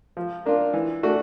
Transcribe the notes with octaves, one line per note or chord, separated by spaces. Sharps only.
F3
A#3 D4 F4
E3
A3 D4 F#4